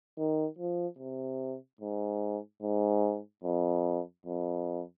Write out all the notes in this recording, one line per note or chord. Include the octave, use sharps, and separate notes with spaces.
D#3
F3
C3
G#2
G#2
F2
F2